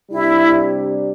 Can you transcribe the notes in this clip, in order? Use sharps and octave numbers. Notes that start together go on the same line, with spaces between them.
C3 G3 D4 E4 G4